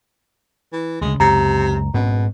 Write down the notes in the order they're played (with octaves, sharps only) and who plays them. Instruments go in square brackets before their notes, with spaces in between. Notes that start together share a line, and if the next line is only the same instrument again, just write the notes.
[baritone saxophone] E3
[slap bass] D2 C#3 [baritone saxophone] G#3
[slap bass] C#2 F#2 [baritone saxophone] C3 [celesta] A#5
[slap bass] G#2 C4 C#4 [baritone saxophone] B2